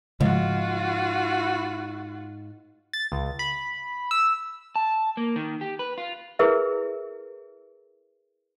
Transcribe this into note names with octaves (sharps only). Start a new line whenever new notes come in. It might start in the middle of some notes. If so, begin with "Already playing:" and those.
G#2 C#3 F3 F4 F#4
A6
C#2
B5
E6
A5
A#3
D#3
G4
B4
F4
E4 G#4 A#4 B4 E5